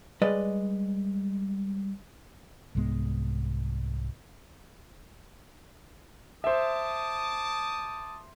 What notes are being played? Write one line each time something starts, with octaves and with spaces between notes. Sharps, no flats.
G3 G#3 B4 D5 D#5
C2 G#2 G#3 B3
C5 E5 A5 D6 D#6